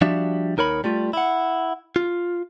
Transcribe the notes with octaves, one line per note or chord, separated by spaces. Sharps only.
F3 G3 D4 F#4 E5
D#2 D#4 A#4 C#5 B5
G3 A3 F4
E4 F#5
F4